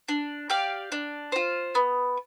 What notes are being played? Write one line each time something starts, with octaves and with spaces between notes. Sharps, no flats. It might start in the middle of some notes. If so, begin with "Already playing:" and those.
D4
G4 D5 F5
D4
F4 C5
B3